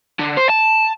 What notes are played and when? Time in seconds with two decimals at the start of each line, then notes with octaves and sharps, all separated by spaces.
0.19 D3
0.37 C5
0.50 A5